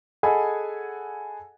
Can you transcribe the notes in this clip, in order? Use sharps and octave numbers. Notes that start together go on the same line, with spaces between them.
G#4 A4 D#5 F#5 G#5 B5